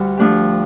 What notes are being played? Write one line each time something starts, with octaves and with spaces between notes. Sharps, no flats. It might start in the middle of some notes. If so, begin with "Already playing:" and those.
Already playing: D2 D3 G3
F3 A3 D4 G4